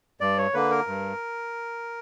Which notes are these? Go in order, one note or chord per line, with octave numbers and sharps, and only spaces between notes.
G2 D5
C#5
D3 A#3 B4
A#4
G2